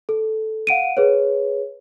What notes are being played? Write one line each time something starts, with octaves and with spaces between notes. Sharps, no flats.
A4
F5 F#5 D7 D#7
G#4 B4 C#5